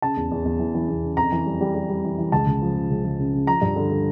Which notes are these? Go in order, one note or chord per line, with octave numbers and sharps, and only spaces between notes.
C#3 A5
E2
E2
E2
E3
E3
E2
C#3
F2 A#5
E3
G3
G3
G3
G3
E3
E3
C#2 A5
C#2
F3
C#3
C#2
C#2
C#3
C#3
F3 A#5
G2
D3
D3